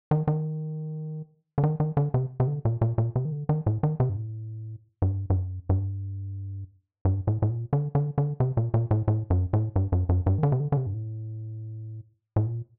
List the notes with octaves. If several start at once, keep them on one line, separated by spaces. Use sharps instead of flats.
D#3
D#3
D3
D#3
D#3
D3
C3
C3
D3
A#2
A#2
A#2
C3
D#3
D3
D#3
A2
D#3
C3
G2
A2
G2
G2
F#2
G2
G2
A2
A2
A#2
D3
D3
D3
C3
A#2
A#2
A2
A2
F#2
A2
G2
F#2
F#2
G2
D#3
D3
C3
D3
D3
C3
G2
A2
A2
A#2